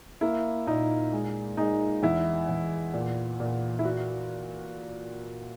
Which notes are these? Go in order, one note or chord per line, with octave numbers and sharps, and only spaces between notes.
A#3 E4
A#2 D#4
G#3
G#3 D#4
E2 E4
E2
A#2
A#2
E4
F#4